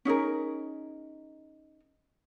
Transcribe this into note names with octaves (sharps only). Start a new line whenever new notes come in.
C#4 D#4 G#4 A#4